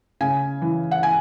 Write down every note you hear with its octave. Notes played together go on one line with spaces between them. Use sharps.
C#3 G#5
E3
F#5
G#5